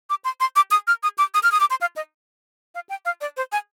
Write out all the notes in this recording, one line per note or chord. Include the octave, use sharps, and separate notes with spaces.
D6
C6
C6
D6
D#6
F6
D#6
D6
D#6
F6
D#6
D6
C6
F5
D#5
F5
G5
F5
D5
C5
G#5